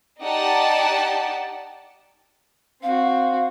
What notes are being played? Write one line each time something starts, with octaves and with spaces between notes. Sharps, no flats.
D#4 G4 D5 F#5 A5
C4 F#4 F5